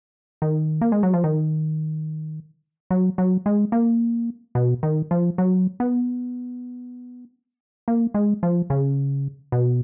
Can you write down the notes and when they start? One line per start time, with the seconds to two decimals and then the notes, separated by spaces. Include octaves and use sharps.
0.42 D#3
0.81 A#3
0.92 G#3
1.03 F#3
1.14 F3
1.24 D#3
2.91 F#3
3.18 F#3
3.46 G#3
3.72 A#3
4.55 B2
4.83 D#3
5.11 F3
5.38 F#3
5.80 B3
7.88 A#3
8.14 G#3
8.43 F3
8.70 C#3
9.52 B2